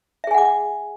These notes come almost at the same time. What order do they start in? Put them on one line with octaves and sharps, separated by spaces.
E5 G#4 G#5 F#5 D6